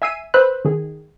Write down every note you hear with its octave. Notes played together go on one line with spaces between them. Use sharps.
E5 G#5 E6 C7 D#7
B4 C5 B5 E6 F#6
D#3 G#4